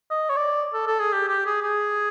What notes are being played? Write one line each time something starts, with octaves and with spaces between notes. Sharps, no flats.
D#5
C#5
D5
A4
A4
G#4
G4
G4
G#4
G#4